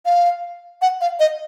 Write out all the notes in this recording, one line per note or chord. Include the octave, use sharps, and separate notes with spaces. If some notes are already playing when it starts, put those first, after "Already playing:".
F5
F#5
F5
D#5